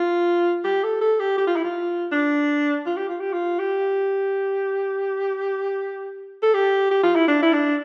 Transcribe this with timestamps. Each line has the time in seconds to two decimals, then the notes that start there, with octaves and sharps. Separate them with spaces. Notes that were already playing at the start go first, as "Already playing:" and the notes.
Already playing: F4
0.64 G4
0.83 A4
1.01 A4
1.19 G4
1.38 G4
1.47 F4
1.56 E4
1.64 F4
2.12 D4
2.86 F4
2.97 G4
3.09 F4
3.20 G4
3.33 F4
3.59 G4
6.43 A4
6.54 G4
6.91 G4
7.03 F4
7.15 E4
7.28 D4
7.42 E4
7.53 D4